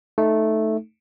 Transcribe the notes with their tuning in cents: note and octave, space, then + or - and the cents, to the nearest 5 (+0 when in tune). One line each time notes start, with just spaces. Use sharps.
A3 -5 D#4 +0